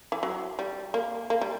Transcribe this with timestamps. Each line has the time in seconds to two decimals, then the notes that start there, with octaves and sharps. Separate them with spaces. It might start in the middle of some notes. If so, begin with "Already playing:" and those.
0.12 E3
0.23 F#3
0.59 G3
0.94 A#3
1.30 A#3
1.41 G3